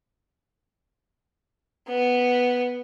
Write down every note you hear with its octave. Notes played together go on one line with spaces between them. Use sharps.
B3